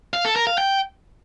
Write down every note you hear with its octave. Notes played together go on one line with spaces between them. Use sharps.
F5
A4
A#4
F5
G5